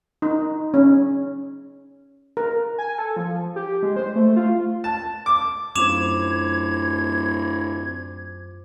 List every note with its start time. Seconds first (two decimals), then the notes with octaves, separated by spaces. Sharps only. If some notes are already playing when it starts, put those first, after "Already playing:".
0.22 D#4
0.74 C#4
2.37 A#4
2.78 G#5
2.98 A4
3.16 F3
3.56 G4
3.83 G#3
3.96 C5
4.16 A3
4.37 F4
4.84 A5
5.26 D6
5.75 D1 F#2 F4 C5 D6 G#6 E7 F7